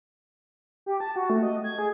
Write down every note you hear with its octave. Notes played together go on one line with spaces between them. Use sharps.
G4
A5
F#4
A3
D#5
G#6
G#4